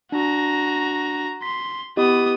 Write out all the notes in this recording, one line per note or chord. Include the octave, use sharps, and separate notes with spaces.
D4 F#4 A#5
C6 B6
B3 E4 G4 D#5 D#6